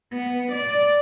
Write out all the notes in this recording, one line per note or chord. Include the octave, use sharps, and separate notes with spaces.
B3
D5